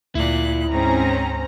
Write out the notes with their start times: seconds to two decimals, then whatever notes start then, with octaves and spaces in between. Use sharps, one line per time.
0.15 D2 A#2 E4 D5 F#6
0.71 G#2 C4 C#4 A#5